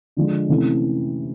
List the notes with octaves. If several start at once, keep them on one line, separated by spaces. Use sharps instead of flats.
D3 F3 G#3
C3 E3 A3 C#4 E4